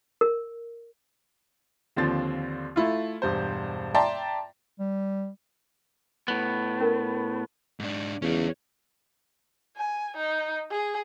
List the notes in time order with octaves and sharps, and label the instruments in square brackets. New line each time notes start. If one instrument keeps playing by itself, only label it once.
[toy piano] A#4
[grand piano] D#2 D3 F3 C4 A6
A3 E4 F4
E1 G2 C5
D5 E5 G5 A5 A#5 C6
[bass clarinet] G3
[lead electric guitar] A2 B3
[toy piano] C#4 A#4
[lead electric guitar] G#2 D4
[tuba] E2 [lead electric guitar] C#4 F4
[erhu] G#5
D#4
G#4